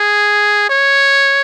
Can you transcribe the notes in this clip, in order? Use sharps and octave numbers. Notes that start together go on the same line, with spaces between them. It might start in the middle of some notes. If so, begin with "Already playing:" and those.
Already playing: G#4
C#5